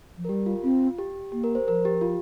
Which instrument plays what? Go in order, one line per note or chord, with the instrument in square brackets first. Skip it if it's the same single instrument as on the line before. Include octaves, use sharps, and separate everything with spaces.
[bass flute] F3
[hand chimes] A#4
[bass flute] G3 [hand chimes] G4
[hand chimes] F4
[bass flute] C4 [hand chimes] F4
[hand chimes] G4
[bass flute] A#3 [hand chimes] G4
[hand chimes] A#4
C5
[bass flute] F3 [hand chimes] A#4
[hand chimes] G4
F4